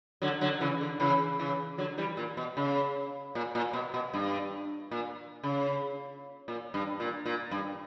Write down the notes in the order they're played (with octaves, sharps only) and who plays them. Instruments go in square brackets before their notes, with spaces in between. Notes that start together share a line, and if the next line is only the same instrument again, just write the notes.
[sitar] D3 F#3
D3 F#3
C#3 E3
D3
C#3 E3
C#3 E3
D3 F#3
E3 G3
A#2
B2
C#3
A#2
A#2
B2
B2
G2
A#2
C#3
A#2
G2
A#2
A#2
G2